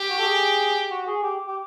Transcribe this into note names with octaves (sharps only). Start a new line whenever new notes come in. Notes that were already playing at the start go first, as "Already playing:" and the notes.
Already playing: G4
F#4
A4
G#4
F#4
G#4
G4
G4